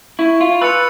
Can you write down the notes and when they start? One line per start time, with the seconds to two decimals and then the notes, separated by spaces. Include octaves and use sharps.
0.19 E4 C#6
0.41 F4
0.61 B4 E6 A6 C#7 F7